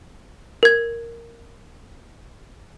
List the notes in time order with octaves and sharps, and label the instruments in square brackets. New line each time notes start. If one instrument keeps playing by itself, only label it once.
[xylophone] A#4 G#6